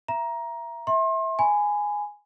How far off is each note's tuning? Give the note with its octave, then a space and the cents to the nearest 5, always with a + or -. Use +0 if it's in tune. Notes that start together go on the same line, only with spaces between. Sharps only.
E5 +25 A#5 +15
E5 -20 C6 +35
G#5 +0 B5 +30